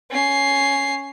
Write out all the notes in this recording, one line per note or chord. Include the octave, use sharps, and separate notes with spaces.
C#4 C7